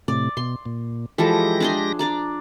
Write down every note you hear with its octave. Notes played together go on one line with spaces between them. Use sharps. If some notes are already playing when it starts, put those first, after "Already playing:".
A2 C3 D5
B2 C6
A#2
E3 F3 G#3 G4 A4 A#6
D4 G#4 C6
D4 D5 A#5